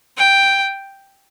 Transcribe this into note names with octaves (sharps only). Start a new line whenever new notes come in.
G5